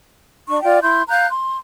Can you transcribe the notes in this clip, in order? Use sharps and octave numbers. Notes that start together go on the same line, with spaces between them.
D4 C#6
F4 D5 G5
E4 C6 G6
F5 A#5 F#6 G6
C6